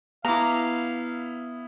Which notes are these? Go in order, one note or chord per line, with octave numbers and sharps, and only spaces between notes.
B3 E4 F5 A#5 D6